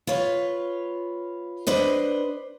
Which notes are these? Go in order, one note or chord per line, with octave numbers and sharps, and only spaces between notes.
F4 B4 C#5
D4 B4 C5 D#5